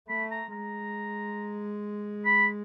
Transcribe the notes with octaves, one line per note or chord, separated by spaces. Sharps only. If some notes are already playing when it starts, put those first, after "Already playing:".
A3 B5
A#5
G#3 A#5
B5